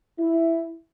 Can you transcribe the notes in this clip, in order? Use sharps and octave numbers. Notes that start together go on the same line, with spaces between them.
E4